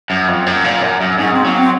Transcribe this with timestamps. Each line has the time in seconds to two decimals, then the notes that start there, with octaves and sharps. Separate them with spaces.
0.10 F#2
0.28 F2
0.46 F#2
0.64 A#2
0.82 F#2
1.01 F#2
1.18 G#2 C#4
1.32 C4
1.45 F#3 A#3
1.59 C4